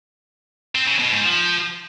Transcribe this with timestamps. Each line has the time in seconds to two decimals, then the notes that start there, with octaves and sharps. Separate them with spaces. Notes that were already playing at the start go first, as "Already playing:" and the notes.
0.75 C4
0.87 C#3
0.99 B2
1.11 G#2
1.23 F3